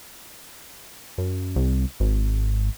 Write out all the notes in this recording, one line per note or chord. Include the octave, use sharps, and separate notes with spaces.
F#2
C2
G#1